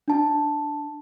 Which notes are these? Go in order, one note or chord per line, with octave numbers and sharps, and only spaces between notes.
D4 A5